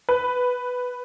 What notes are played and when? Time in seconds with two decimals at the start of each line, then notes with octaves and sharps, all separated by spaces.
0.09 B4